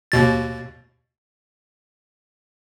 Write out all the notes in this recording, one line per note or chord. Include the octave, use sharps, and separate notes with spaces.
D#2 B2 A6